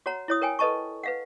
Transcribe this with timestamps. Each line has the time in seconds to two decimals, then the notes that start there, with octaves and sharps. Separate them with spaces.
0.06 F#4 C#5 F#5 A#5
0.28 E4 C#5 D#6
0.42 A#4 C#5 G5 G#5
0.59 A4 B4 D#5 A5 C#6
1.03 B4 F5 F#5